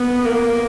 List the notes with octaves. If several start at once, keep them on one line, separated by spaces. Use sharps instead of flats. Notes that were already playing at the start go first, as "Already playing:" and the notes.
Already playing: B3
A#3